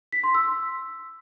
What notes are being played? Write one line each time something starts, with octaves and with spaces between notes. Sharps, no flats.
B6
C6
E6